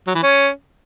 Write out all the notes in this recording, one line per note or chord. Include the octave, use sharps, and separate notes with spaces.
F#3
E3
C#4